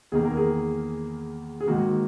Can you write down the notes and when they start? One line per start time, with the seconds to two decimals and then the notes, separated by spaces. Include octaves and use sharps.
0.12 E2 D#3 A#3 G#4
0.25 A#4
0.37 G#4
1.61 G#4
1.67 G#2 D#3 A#3 F#4